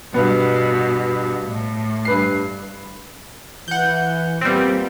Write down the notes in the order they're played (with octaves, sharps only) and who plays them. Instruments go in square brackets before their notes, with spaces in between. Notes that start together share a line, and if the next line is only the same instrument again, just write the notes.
[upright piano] G2 B3 [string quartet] B2
[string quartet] A2
[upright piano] G2 B4 C7
[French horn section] E3 [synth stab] F#5 G6
[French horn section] A#2 B3 [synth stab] G3 C4